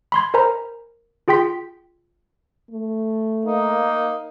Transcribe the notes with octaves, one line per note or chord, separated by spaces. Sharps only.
B5 C6 G#6
A#4 C5 G#5 A#5 B5
F4 G#4 G5 C6 B6
A3
A#3 D#4